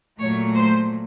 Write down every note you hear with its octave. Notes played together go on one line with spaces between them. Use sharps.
A#2 F#3 A3 C#5
C5